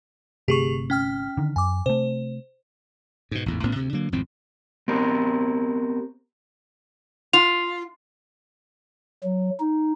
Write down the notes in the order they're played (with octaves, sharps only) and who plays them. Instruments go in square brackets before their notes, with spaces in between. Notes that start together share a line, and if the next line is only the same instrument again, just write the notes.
[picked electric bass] G1 C3 A3 [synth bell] G4 G#4 C#6
[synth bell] C#4 G5 F6
[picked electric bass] D3 D#3
[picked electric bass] F#2 [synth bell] G#5 D6
[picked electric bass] C3 A3 [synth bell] C5
[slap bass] G#2 B2
A1 E2 G#2
A1 A2 B3 C#4
D2 C3
D3 F#3 A#3
G#1 F2 A2 C4
[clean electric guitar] B3 C4 G4 A#4
[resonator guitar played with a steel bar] F4 [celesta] F7
[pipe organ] F#3
D#4